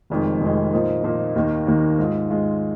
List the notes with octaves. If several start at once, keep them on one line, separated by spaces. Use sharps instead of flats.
F1 F2 D#3 G#3
F1 F2 D#3 G#3
A#2 F3 A#3 D#4
A#2 F3 A#3 D#4
D#2 D#3 A#3
D#2 D#3 A#3
G#2 G#3 F4
G#2 G#3 F4